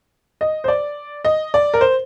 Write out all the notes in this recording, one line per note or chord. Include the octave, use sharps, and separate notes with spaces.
D#5
C5
D5
D#5
D5
A#4
C5